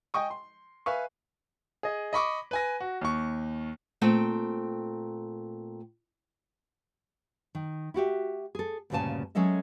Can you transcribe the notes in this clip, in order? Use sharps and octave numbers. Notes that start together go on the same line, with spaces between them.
D#5 G5 G#5 C#6 D#6
C6
B4 E5 F5 G#5 C#6
G#4 D#5
D#5 B5 C#6 D6
B4 G#5 A#6
F#4
D#2 C#6
A#2 A3 C4 G5
D#3
E4 F#4 G4 E5
G#4 A4
D2 G2 A#2 C#3 G#5 A5
F#3 G#3 C#4 A4 D#5 E5